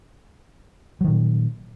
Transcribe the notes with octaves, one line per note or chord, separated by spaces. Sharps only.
A#2 D#3 F#3